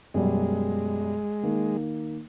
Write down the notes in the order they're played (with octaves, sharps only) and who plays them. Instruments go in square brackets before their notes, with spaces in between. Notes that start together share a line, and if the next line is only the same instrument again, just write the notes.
[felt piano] F#2 B2 G3 [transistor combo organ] G#3
[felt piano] D#3 A#3